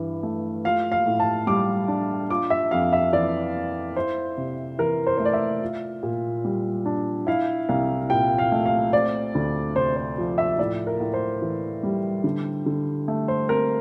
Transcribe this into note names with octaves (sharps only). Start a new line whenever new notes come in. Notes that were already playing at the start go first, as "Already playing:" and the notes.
Already playing: G2 E3
A3
F4 F5
F5
A2
A5
G3 D6
D4
F4 D6
E5
F2 F5
E5
E3 D5
A#3
E4 C5
C3
E3 A#4
C5
A3 C5
D5
E5
F4
A#2
G3
D4
E4 F5
C2 F5
A#2 G5
F5
A3
F5
C4 D5
D2
C3 C5
C5
F3
E5
A2 D5
A#4
A2
C5
E3
G3
D3
D3
A3
C5
C4 A#4